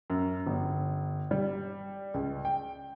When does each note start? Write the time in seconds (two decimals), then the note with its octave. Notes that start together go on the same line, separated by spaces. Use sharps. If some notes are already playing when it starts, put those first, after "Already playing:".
0.10 F#2
0.47 G1
1.31 G3
2.14 C#2
2.45 G5